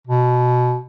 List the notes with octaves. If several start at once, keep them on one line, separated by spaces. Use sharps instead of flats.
B2